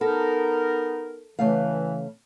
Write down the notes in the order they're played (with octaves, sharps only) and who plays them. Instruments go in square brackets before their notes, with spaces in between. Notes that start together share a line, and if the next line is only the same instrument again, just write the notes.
[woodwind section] B3 D#4 A#4 [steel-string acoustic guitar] A4
[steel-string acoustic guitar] C#3 A3 F5 [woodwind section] E3